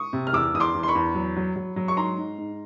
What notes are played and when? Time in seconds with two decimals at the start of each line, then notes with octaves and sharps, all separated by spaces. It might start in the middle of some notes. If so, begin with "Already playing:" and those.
Already playing: C#6 D#6
0.13 C3
0.27 F6
0.33 E2 D6 E6
0.54 E2 D#6
0.60 C6 D6
0.74 E2
0.83 C6
0.88 B5 C#6
0.95 E2
1.15 F#3
1.36 F#3
1.56 F#3
1.76 F#3
1.88 C#6
1.97 G#2 A#5 C6
2.18 G#2
2.38 G#2